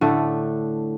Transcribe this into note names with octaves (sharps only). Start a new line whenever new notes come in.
A2 D3 A3